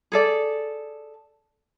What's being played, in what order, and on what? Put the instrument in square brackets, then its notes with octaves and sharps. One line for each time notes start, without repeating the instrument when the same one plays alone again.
[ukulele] G#4 A4 D5